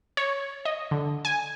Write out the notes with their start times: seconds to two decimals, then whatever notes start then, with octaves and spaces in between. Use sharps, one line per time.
0.17 C#5
0.65 D#5
0.91 D3
1.25 G#5